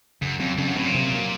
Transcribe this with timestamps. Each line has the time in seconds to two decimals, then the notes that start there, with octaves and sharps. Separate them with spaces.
0.22 F#2 C#3
0.39 F2 F#3 C4
0.58 F2 C#3
0.67 F#2
0.76 A2 F#3 C4
0.85 A#2
0.94 C3
1.12 F#3 A#3